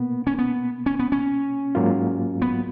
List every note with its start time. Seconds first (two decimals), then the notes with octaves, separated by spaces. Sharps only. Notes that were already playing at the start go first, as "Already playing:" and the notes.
Already playing: B2 A#3 B3
0.27 C#4
0.39 B3
0.86 C#4
0.99 B3
1.12 C#4
1.75 G#2 F#3 A#3 F4
2.42 B3